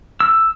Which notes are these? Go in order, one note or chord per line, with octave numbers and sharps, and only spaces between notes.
E6